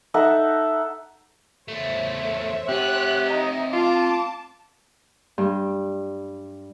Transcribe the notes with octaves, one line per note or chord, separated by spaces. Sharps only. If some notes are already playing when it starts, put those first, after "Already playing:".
D#4 A4 E5 F#5
E2 A3 C5 C#5 E5
C4 G4 F#5 F#6
D#4
F4 A5 D6
G2